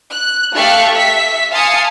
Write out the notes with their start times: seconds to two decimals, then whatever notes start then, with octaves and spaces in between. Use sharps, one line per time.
0.12 F#6
0.54 A3 G4 F5 C#6 F#6
0.94 E5 B6
1.52 F5 G#5 A5 C6 D#6 C#7